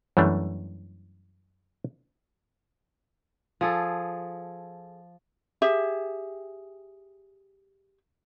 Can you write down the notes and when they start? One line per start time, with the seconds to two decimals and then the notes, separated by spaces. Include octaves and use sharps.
0.17 F#2 E3 G3 A3 D4
3.61 F3 G#4 A4
5.62 G4 G#4 E5